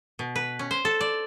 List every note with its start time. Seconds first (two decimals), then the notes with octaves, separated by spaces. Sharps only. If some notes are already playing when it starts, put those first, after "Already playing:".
0.19 B2
0.35 B4
0.59 C#4
0.71 C5
0.85 A4
1.01 D5